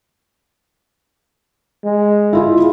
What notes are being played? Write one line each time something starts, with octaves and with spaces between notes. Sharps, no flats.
G#3
E4 F4 G#4